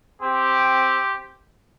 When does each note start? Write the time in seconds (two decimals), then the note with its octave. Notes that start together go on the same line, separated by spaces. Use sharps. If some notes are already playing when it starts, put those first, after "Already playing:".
0.22 C4 G4